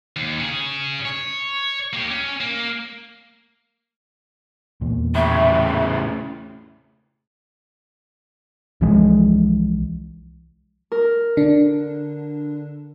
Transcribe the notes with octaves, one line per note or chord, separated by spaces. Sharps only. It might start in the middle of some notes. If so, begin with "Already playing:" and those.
D#2
C#4 G#4
C#5
A#3 G4
C#4
A#3
E2 A#2
A2 C#3 E5
C2 E3 F3 G#3
A#4
D3 D4